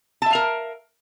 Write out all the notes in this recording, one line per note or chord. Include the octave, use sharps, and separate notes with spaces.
A#4 E5 F5 A5